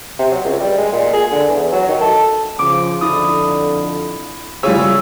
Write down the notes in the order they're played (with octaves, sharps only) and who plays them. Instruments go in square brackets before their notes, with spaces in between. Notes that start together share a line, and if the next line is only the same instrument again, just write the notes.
[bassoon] C3
F#3
C#2
G3
G#3
A#2
G#4
D3
E2
F#3
D#3
A4
[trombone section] C#3 F3 [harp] D6
[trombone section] F2 D3 [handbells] E4 D#6
[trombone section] C#3 [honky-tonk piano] G3 F4 C#5 [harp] E4 G#4 [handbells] E6